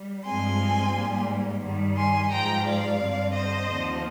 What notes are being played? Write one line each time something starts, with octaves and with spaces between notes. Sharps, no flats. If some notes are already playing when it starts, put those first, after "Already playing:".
Already playing: G3
G2 F3 G#3 C4 G#5 C6
G#2 G3 A#3
G2 D#3 G3
G#5 C6
G#2 F3 G#3 G5 A#5
D5 F5
G2 D3 G3 C4
C5 D#5
D#2 D3 F3 C4